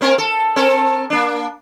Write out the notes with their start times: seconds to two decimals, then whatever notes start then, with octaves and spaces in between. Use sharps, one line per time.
0.01 A#3 C4 A#4
0.18 A4
0.56 C4 A4 A#4
1.10 A#3 D4